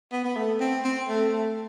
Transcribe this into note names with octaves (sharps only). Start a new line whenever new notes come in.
B3
B3
A3
C4
C4
A3
A3